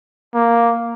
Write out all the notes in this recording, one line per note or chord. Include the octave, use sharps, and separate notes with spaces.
A#3